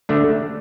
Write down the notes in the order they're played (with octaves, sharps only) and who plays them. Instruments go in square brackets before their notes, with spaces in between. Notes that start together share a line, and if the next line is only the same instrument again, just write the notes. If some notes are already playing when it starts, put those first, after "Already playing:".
[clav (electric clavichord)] D3 A3 D4